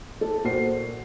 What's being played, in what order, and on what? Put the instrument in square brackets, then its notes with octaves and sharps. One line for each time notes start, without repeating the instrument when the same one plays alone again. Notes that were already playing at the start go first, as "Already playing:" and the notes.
[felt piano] A4
A#2 F#4 C5 C7